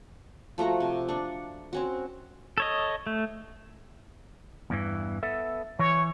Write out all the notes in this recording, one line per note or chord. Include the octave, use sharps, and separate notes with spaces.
F3 A3 F#4 A#5
C3
D4 C#6
C4 C#4 F#4
A4 C#5 D#5
A3
E2 G2 E3
B3 A4 E5
E3 C#5